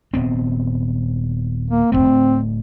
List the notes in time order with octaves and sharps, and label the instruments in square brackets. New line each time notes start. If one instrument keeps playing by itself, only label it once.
[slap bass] D#1 B3 C4
[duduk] A#3
[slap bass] D1 C#2 A3 [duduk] C4